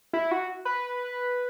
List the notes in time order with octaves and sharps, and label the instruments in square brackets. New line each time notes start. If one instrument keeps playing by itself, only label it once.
[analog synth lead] E4
F#4
B4